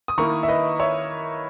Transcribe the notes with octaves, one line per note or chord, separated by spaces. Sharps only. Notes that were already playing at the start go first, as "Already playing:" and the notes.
D#6
D#3 A#3 E4 A#5 C#6
E5
B4 D#5
C#5 E5